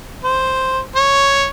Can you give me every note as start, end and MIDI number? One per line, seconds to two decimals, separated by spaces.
0.24 0.80 72
0.95 1.48 73